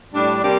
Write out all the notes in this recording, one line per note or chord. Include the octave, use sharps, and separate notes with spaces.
A2 G3 D4
C3 G3 A#3 D4 G4